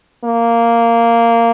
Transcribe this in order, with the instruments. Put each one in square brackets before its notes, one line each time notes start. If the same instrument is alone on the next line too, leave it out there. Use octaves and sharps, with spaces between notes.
[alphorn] A#3